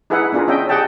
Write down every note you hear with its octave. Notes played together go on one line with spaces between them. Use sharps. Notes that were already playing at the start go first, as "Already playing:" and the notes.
D#4 E4 G#4 B4 E5 F#5
B3 D4 F4 G#4 A#4
C#4 D#5 E5 G5
G4 G#4 D#5 F#5 G5 A5